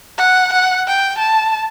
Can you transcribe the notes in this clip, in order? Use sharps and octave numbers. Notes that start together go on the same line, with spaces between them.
F#5
F#5
G5
A5